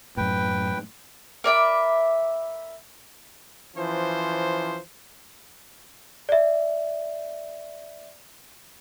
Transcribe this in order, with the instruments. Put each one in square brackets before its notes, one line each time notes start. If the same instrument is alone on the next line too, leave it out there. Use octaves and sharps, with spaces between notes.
[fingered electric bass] F#2 A2 [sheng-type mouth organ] B4 G5
[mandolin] A#4 D5 E5 B5
[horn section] E3 F3 C#4 C5
[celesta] D5 E5